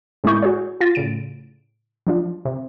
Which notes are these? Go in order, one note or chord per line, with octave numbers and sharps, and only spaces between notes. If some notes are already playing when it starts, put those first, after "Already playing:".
A2 G#3 A#3 E4 C#6 G6
F#4 G#4 C#5
F4 A6
A2 C#3 D7
F3 D4 F4
C3